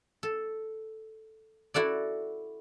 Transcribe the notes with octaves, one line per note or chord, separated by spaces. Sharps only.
A4
E4 F#4 A4 D5